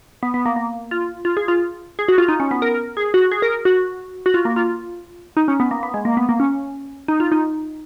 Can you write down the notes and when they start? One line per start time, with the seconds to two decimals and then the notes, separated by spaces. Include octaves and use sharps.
0.23 B3
0.34 B3
0.46 A#3
0.56 A#3
0.91 F4
1.25 F4
1.37 G#4
1.48 F4
1.99 G#4
2.08 F#4
2.18 F4
2.28 D#4
2.40 C#4
2.51 B3
2.62 A#4
2.97 G#4
3.14 F#4
3.31 G#4
3.42 A#4
3.65 F#4
4.26 F#4
4.34 F4
4.45 A#3
4.56 F4
5.37 D#4
5.48 C#4
5.60 B3
5.71 A#3
5.83 B3
5.94 G#3
6.05 A#3
6.17 B3
6.29 A#3
6.40 C#4
7.08 D#4
7.20 F4
7.32 D#4